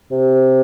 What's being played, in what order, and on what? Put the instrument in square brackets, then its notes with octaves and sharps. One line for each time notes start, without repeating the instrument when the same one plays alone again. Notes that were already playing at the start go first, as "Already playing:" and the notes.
[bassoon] C3